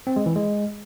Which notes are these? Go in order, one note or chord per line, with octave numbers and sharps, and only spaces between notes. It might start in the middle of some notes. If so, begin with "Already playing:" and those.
C4
G#3
E3
G#3